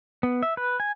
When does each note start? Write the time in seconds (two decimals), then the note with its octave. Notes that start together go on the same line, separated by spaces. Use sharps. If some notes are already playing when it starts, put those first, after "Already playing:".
0.23 B3
0.43 E5
0.57 B4
0.80 G#5